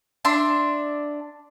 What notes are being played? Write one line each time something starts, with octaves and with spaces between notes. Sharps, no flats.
D4 E5 C6